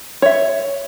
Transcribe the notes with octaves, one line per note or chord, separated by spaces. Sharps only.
C#5 E5